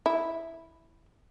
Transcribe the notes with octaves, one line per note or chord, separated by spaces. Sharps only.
E4